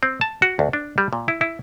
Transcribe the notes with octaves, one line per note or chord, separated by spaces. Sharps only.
C4
A5
F#4
D2
D4
G3
A#2
E4
E4